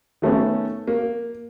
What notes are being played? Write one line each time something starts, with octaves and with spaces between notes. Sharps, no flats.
D#3 A3 B3 C#4
A#3